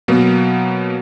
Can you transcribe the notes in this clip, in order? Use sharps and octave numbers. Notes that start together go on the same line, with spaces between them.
B2 F#3 A#3 B3